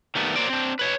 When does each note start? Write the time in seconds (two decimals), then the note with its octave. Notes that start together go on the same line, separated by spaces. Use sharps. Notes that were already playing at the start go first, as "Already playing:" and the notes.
0.15 D#3 G3 A3 B3
0.36 F#3 A#3 C5 D5
0.49 C4 D4
0.79 B4 C#5